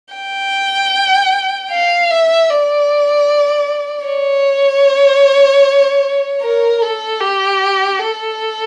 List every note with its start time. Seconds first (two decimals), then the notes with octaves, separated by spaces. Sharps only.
0.15 G5
1.71 F5
2.11 E5
2.50 D5
4.07 C#5
6.42 A#4
6.82 A4
7.20 G4
7.99 A4